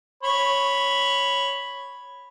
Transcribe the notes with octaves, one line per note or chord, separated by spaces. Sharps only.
C#5 B5